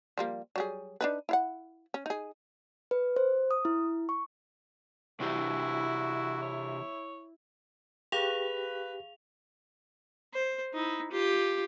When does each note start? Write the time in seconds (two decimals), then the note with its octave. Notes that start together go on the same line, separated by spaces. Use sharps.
0.18 F3 G3 A#3
0.56 F#3 G3 G#4
1.01 D4 D#4 B4
1.29 E4 F5 F#5
1.94 C#4
2.06 D#4 G#4
2.91 B4
3.16 C5
3.51 D#6
3.65 E4
4.09 C#6
5.20 C3 E3 E4 F#4 G4
6.42 C#5
8.12 G4 G#4 B4 F5 F7
10.34 C5
10.74 D#4 E4
11.11 F4 G4